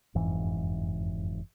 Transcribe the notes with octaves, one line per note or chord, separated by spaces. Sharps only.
F#1 F2 G#2 E3